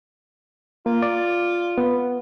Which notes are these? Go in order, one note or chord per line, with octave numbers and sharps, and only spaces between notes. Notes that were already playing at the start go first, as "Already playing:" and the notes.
A#3 F4
D5
B3